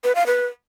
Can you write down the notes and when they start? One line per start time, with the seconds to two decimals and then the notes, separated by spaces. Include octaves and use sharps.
0.04 B4
0.15 F5
0.27 B4